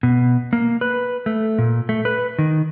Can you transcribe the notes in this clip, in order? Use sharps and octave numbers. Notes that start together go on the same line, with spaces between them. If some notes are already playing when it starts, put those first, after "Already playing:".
B2
A#3
B4
A3
A#2
A3
B4
D#3